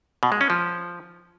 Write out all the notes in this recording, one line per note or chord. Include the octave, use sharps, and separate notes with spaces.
B2
G#3
C#4
F3